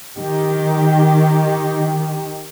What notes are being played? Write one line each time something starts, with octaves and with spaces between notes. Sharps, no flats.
D#3 G4